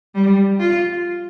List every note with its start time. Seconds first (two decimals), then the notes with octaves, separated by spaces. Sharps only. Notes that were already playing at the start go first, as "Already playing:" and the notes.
0.15 G3
0.60 F4